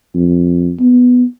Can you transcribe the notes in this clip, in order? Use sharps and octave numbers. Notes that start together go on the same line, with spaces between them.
F2
B3